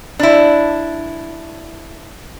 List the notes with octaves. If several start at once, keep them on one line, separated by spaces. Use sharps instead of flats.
D4 E4